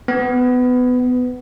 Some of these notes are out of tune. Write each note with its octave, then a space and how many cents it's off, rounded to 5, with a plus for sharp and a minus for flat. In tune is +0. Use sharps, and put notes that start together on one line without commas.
B3 +20